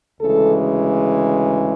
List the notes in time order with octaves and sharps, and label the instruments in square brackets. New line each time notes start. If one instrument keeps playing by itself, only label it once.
[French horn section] D2 C#3 E3 G#3 A4